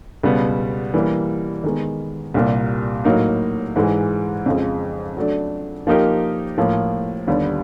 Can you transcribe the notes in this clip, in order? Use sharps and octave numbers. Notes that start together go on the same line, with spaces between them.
C#2 B2 G3 B3
E3 G3 A#3
D#3 G#3 B3
C2 A#2 G3 A#3
A2 F#3 A#3 D#4
G#2 E3 G#3
F2 C#3 F3 G#3
F#3 A3 D4
F3 A#3 D#4 G4 A#4
A2 F3 A#3
D#2 D3 G3 B3 D4